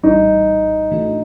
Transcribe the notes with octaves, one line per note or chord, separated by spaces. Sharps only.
A#1 A2 E3 G3 D#4
A2 E3 A3 D4 F#4